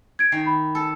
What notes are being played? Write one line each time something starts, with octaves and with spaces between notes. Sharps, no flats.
G#6 D7
D#3 C7
B5
A4